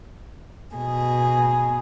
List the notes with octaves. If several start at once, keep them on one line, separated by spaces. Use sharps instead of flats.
B2 G#4